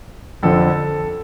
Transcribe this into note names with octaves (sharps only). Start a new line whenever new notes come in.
F2 D3 F3 A4